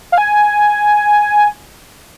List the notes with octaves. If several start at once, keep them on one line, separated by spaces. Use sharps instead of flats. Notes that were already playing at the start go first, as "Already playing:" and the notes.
F5
G#5